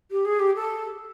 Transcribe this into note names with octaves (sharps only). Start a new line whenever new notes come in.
G4
G#4
G4
A4